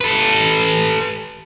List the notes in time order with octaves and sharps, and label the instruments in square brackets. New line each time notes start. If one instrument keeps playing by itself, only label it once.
[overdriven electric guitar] A4 B4